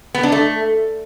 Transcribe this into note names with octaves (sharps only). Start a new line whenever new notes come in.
B3
D4
A3